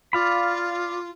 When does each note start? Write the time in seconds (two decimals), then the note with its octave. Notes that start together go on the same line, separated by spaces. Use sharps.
0.13 F4 D5 F5 B5